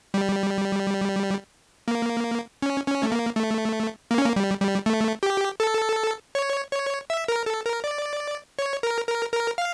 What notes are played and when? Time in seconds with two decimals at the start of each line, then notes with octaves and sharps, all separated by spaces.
0.14 G3
1.88 A#3
2.62 C#4
2.87 C#4
3.03 A3
3.12 A#3
3.36 A3
4.11 A#3
4.18 C#4
4.26 A#3
4.36 G3
4.61 G3
4.86 A3
5.23 G4
5.60 A4
6.35 C#5
6.72 C#5
7.10 E5
7.28 A#4
7.46 A4
7.66 A#4
7.84 D5
8.59 C#5
8.83 A#4
9.07 A#4
9.33 A#4
9.58 F5